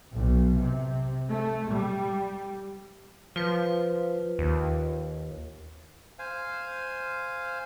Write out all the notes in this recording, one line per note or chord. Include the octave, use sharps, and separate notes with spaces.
B1
C3
A3
G3
F3 F4 B4
D#2
C5 F5 G#5